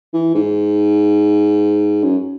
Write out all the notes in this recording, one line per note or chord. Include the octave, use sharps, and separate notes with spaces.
E3
G#2
F#2